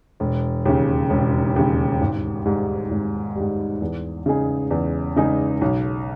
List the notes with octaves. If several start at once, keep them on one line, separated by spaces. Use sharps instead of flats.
E1
D#2 C#3
E1
D#2 C#3
G#1
G#2 G3
G#1
G#2 G3
E2
C#3 G#3 D#4 G#4
E2
C#3 G#3 D#4 G#4
B1